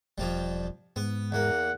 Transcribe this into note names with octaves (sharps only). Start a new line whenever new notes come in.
E1 F2 F3 G3
G#2 B3
E2 A#3 F#5